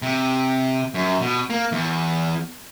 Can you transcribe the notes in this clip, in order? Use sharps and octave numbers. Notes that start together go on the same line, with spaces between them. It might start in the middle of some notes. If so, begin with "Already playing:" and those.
C3
F#2
B2
A#3
E2